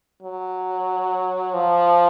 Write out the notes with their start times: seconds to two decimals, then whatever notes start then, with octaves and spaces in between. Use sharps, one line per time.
0.23 F#3
1.54 F3